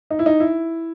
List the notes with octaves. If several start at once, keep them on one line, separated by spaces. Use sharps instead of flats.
D#4
E4
D#4
E4